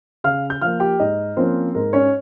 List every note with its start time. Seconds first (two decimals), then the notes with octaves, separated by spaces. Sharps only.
0.24 C#3 F5 F6
0.50 G6
0.62 F3 A#3 F5 F6
0.80 G4 G5
0.99 G#2 D#4 D#5
1.37 F3 A#3 C4 C#4 C5
1.75 G#2 A#4
1.93 C#4 C#5